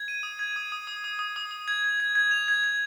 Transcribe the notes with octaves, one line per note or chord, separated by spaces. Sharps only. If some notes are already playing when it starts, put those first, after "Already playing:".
Already playing: G#6
D#7
D#6
G#6
D#6
D#6
D#6
D#6
D#6
D#6
D#6
G#6
G#6
G#6
G#6
F7
G#6
G#6